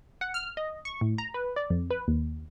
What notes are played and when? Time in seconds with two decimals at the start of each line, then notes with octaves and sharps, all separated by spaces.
0.21 F#5
0.34 F6
0.57 D#5
0.85 C#6
1.01 A2
1.18 A#5
1.34 B4
1.56 D5
1.70 F2
1.91 B4
2.08 D#2